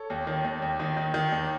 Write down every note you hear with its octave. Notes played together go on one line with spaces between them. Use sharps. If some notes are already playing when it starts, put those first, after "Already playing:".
Already playing: A4 C#5
D#2
D#3
D#2
D#2
D#3
D#3
D#3
D#2